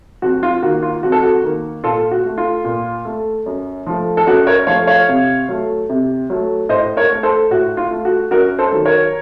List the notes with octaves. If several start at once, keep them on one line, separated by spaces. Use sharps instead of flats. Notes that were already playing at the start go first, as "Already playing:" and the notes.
F2 F#4
F4
D#3 A#3 F#4
F4
F2 F#4
A4
F#4
D#3 A#3
A#2 F4 A4
F#4
A3
F4
A#2
A3
F#2
F3 A3
A4
F#2 F#4
A#4 C#5
F3 A3 C#5 F5
C#5 F5
C3
F#3 A3
C3
F#3 A3
A2 C5 D#5
A#4 C#5
A3
A4 C5
A2 F#4
F4
A3
F#4
F#2 F#4 A#4
A4 C5
D#3 F#3
A#4 C#5